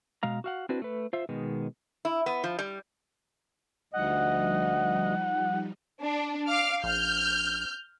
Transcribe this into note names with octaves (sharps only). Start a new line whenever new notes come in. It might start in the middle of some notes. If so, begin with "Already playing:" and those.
B2 G#3 F5 A#5
F#4 F5 F#5
C4 D4 E4 F#4 B4
A3 B4
F4 C5 E5
B2 D#3 G#3 B3
E4
B3
F3
G3
D2 F3 G3 D#4 D#5 F#5
D4
F5 D6 F6
A#1 F6 G6